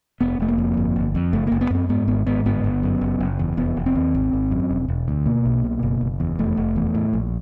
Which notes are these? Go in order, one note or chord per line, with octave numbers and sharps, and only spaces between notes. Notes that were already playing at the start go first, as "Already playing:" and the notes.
F1 B3
F1 A3
A#3
F2
G1
G1
F2
F#1 A3
A#3
F#1
B3
F#2 C4
G#2 B3
G#1 B3
G#2 B3
G1 B3
G1
F#2
F#1
F#1
E2
F1 B3
F1
C4
D#2
G#1
G#1
F#2
E1
E1
D2
B2 A#3
B1
B2
F#1
F#1
E2
F1 A3
F1
E2
A2
A#1